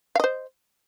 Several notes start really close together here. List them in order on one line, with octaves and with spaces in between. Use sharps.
F5 D#5 C5